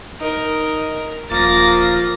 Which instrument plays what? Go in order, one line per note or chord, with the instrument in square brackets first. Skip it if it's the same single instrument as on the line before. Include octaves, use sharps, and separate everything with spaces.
[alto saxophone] D#4 [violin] A#4
[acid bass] D#1 [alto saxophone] F3 [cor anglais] A#3 [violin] A6 A#6